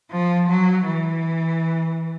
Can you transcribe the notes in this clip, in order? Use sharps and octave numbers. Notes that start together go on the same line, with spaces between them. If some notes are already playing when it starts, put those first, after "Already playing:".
F3
F#3
E3